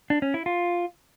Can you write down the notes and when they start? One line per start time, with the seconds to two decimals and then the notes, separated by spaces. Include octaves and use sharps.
0.10 D4
0.22 C#4
0.34 E4
0.46 F4